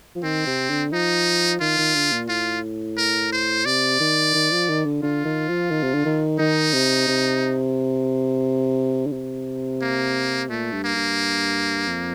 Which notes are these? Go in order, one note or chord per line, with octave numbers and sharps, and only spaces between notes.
F3
D#3 C4
C3
D3
F3 D#4
D#3 F4
D#3
D3
A#2
A2 F4
A#4
C5
C3 D5
D#3
D#3
F3
D#3
D3
D3 F4
D#3
F3
D#3
C3
D3
D#3
D#3 D#4
C3
C3
D3
C3
A#3
A#2 A3
G2
A#3
G2
F2